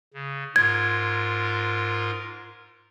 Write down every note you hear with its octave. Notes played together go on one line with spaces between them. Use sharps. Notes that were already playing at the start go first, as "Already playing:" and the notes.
C#3
G#2 F4 A#4 G#6